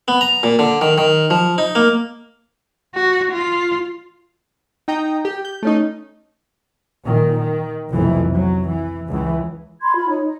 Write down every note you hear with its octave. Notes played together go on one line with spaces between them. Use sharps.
B3
A#5
A#2
D3
D#3
D#3
F3
D#4
A#3
F#4
F4
D#4 G5 A#5 D#6
G4
G6
A3 C#4 D#4
A#2 D#3
D#3
F1 B1 F2 E3
F#3
E3
C#2 E3
B5 C6 G#6
F4 B5
D#4 C#5
D#5